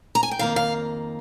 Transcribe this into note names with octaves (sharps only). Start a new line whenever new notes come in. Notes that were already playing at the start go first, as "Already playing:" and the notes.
A#5
G#5
G5
F2 D#3 A#3 F5
F5